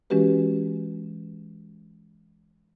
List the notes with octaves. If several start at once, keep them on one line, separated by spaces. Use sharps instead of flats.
E3 G#3 C#4 F#4 G4 B4